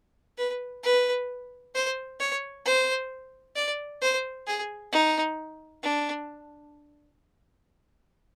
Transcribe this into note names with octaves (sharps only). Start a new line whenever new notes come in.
B4
B4
C5
C#5
C5
D5
C5
G#4
D#4
D4